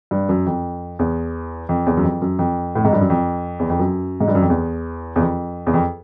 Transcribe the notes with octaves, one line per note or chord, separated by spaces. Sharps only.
G2
F#2
F2
E2
F2
E2
F#2
F2
F#2
F2
A2
G#2
G2
F#2
F2
E2
F2
F#2
G#2
G2
F#2
F2
E2
E2
F2
E2
F2